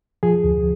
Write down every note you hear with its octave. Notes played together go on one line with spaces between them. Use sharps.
F3 G#4
D2